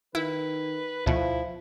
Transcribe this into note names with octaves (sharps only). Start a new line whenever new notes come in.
D#3 E4 B4
D2 B2 F3 E4